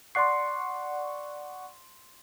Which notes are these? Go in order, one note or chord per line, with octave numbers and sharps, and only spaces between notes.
D5 F#5 C6 C#6 C7